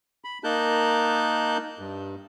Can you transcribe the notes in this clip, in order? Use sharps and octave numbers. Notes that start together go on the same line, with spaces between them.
B5
A#3 D#4 A#4 A5 F#6 G6
G2